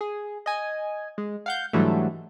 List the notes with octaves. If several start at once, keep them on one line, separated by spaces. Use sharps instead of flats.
G#4
D#5 G#5
G#3
F5 F#5 G6
G#2 D3 E3 F#3 G3 A3